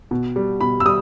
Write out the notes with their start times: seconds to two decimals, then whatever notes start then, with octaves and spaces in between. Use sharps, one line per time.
0.11 B2
0.36 G3
0.61 B2 B5
0.80 E6
0.86 G3 D#6